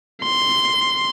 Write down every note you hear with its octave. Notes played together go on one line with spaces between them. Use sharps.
C6